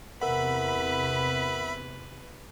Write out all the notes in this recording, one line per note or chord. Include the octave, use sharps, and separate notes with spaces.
E2 C3 A#4 B4 E5 F#5 B5